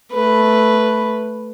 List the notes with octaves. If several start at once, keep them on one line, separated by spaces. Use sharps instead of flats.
A3 B4